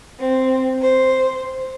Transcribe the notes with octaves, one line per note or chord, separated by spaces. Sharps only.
C4
C5